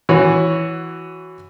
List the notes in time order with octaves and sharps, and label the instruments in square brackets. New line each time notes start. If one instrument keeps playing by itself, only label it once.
[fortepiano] E3 F#4 C#5